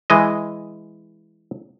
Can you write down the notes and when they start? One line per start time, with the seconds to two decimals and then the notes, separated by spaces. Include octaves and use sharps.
0.10 E3 G#3 D#5